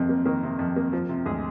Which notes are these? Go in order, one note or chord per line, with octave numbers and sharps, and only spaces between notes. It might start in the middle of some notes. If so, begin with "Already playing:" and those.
Already playing: F2 C3 D#3 C5
A#3
D#3 A#3 A#4
C3
F2
A#3
F3
C3
D2 G#3 G#4